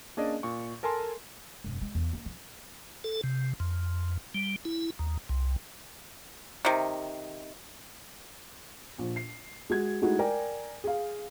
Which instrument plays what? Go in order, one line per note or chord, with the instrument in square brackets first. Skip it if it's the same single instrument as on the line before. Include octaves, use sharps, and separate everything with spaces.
[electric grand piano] A#3 C#4 D4 G#4 D5 D#5
A#2 C#6
A4 A#4 G#5 A5 C6
[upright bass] E1 F#2
G#3
E2
A#3
F3
[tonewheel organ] A4
C3
F2
G3
E4
D#2
C2
[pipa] C3 D#3
[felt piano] A#1
C7
G#3 F#4 G#6
G#3 A3 D#4 E4 F#4
A#4 D5 G5 G#5
G#4 F5